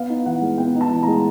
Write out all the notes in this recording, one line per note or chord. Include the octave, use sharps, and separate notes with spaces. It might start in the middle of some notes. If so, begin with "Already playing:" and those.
Already playing: B3 F5
D#4
E3 F#5
G#3
B3 G5
D#4
A5
E3
G#3 A#5